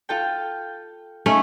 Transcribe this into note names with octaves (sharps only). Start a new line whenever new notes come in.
F4 A4 G5
A3 C#4 D#4 F4